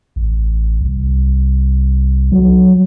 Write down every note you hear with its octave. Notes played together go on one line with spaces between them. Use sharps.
A1
C2
F#3